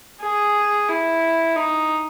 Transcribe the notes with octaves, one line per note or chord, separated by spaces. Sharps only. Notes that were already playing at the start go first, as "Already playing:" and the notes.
G#4
E4
D#4